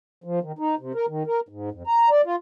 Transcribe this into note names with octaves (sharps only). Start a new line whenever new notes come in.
F3
D#3
D#4
C3
A#4
D#3
A#4
G#2
F2
A#5
D5
F4